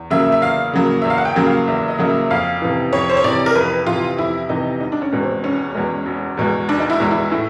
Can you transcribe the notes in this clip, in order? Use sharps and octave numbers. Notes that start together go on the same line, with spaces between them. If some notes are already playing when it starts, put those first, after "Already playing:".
Already playing: E2
C#3 F#3 A#3 E5
E5
E2 F5
C#3 F#3 A#3
E2 E5
F5
F#5
G5
C#3 F#3 A#3
F5
E2 E5
E5
D#5
C#3 F#3 A#3
E5
F2 F5
C3 E3
F2 C#5
C5
C#5
C3 E3 D5
A#4
F2 B4
C3 E3 F4
F2 E4
C3 E3 D#4
E1 D#4
D4
C#4
E2 B2 G#3
C4
E1 C#4
E2 B2 G#3
E1
E2 B2 G#3
E1 D4
D#4
E4
E2 B2 G#3
E4
A2 E4